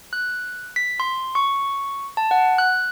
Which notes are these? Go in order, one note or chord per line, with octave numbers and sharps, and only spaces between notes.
F#6
B6
C6
C#6
A5
F#5
F#6